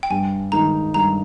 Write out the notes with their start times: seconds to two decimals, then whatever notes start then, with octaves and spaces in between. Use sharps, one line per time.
0.03 G5
0.10 G2 G#5
0.52 D#3 G#3 D#4 A#5
0.94 G2 A#5